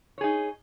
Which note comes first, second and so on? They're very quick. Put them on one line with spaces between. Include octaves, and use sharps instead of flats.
C#5 G#4 D#4